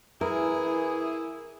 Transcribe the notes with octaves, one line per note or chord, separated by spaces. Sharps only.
E3 E4 G#4 A#4